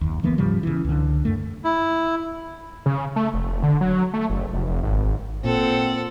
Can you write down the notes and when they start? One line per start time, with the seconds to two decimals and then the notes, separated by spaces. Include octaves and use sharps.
0.01 F#1 D#2
0.23 D2 E3 A#3 B3
0.38 G#2 C#3 F3 G3
0.63 C#3 E3
0.85 C#2 D3
1.25 F#2 A3
1.64 E4
2.86 C#3
3.16 A3
3.34 F1
3.63 D3
3.81 F#3
4.13 A3
4.30 F#1
4.53 F1
4.83 G#1
5.44 A#2 C4 A4 F#5